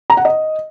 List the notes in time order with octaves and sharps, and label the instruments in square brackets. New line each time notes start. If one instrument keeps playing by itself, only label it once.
[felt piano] A#5
F#5
D#5